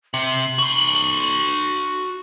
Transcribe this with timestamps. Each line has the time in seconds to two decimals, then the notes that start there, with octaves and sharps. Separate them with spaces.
0.14 C3 F#7
0.58 F#4 C6